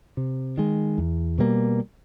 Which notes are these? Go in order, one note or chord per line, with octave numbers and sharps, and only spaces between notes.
C3
D#3 G#3
E2
B2 G3 A#3